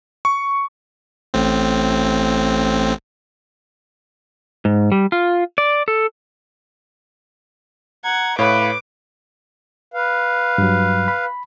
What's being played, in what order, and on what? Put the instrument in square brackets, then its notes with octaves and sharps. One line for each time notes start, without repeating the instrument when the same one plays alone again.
[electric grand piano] C#6
[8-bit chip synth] A1 A2 C4
[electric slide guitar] G#2
G3
F4
D5
A4
[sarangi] F#5 [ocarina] A#5 [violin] G#6
[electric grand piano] A2 C#5 B5 [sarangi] B4 [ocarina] F5 [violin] D6
[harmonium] B4 F5
[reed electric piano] G2 F#3
B5